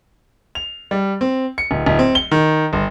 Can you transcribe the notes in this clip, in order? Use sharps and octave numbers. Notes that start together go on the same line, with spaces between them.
F7
G3
C4
C#7
D1
D1
C4
G7
D#3
G1